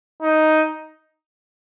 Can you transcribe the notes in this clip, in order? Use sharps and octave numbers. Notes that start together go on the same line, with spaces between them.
D#4